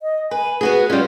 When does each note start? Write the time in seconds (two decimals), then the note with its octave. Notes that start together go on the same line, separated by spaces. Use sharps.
0.02 D#5
0.31 B4 G#5
0.61 B3 F#4 G#4 B4
0.90 G3 C#4 F4